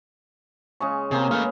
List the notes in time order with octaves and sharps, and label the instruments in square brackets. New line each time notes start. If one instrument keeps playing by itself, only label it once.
[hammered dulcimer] C#3 G#3 C#6
[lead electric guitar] C3 [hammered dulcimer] G#3 A#3
[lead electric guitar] A3 C#4 [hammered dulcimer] B4 F5